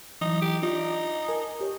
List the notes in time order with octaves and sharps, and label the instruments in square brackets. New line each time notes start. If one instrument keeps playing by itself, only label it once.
[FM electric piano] E3 F#3 [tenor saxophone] D#4
[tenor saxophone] G4
[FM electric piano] D4 F4 D5 [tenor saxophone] D#4
[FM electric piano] A#4 G#5 A5
G4 C#5